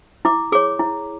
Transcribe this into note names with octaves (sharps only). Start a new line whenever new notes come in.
E4 D6
G#4 C#5 D6
E4